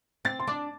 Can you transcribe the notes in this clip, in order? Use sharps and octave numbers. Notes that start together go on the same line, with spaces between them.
C4 A6
C6
D4 D6